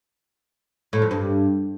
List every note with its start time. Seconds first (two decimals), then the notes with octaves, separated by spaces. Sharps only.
0.93 A2
1.02 F2
1.11 G2